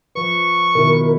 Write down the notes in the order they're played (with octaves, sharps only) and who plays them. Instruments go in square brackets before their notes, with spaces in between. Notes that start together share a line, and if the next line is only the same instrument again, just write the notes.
[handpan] F3 B4 [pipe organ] C#6
[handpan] B2 D#3 E4 [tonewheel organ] A#4